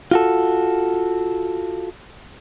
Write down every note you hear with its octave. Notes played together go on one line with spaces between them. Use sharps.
F4 F#4 A4